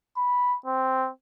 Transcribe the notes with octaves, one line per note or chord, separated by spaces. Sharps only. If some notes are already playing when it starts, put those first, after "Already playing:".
B5
C4